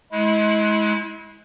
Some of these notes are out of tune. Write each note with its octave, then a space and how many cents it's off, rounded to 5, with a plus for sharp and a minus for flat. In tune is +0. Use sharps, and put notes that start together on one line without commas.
G#3 +30 E4 -20